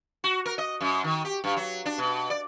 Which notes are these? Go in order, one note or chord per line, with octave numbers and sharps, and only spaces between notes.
F#4
A#4
D#5
F#2
D#3
G4
G2
F#3
D4
B2
D5